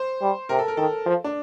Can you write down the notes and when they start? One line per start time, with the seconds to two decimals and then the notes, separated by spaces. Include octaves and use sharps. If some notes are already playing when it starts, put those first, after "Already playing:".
Already playing: C5
0.22 G3
0.49 C3 A#4
0.59 A4
0.68 A#4
0.77 D#3 A4
1.06 F3
1.24 D4